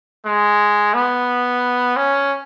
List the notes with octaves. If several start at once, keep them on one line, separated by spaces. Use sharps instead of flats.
G#3
B3
C#4